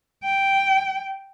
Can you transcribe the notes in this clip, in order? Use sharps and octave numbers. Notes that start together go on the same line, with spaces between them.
G5